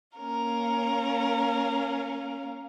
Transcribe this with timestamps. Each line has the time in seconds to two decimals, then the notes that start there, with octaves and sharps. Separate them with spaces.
0.17 A#3 C#4 A#4 F5